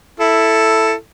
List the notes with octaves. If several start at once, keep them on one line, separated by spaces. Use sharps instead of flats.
E4 A4